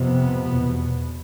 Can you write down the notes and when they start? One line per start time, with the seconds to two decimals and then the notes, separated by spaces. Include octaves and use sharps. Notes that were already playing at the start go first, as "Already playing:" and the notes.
Already playing: F2 C3 B3
0.47 E2 B2